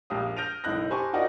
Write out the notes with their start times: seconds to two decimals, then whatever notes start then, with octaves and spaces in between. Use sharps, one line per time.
0.10 A#1 G4 F5 D#6
0.36 F6 G6 A#6 D7 D#7 F7
0.64 F#1 B1 E4 D#5 F#6 A#6
0.90 G4 C5 G#5 A5 B5 C#6
1.13 D#4 F4 F#4 A#4 D5 D#5